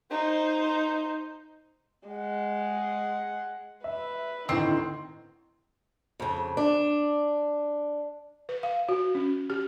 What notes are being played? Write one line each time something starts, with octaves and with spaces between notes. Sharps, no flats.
D#4 C5
G#3 F#5
B4 E5
D2 A2 D#3 C4 D#4
F2 C#3
D4
B4
F5
F#4
C#4
G4